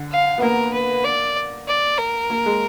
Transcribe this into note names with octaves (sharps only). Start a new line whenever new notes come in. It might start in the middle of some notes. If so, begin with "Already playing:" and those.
Already playing: D3
F5
B3
A#3 A#4
B4
D5
D5
A#4
A#3
G#3